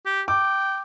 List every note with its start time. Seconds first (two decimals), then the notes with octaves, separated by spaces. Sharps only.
0.06 G4
0.28 G5 D6